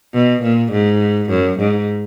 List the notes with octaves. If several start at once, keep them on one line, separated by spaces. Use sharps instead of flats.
B2
A#2
G#2
F#2
G#2